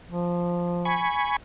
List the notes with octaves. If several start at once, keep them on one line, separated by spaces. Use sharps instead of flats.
F3
G#5 B5 C#6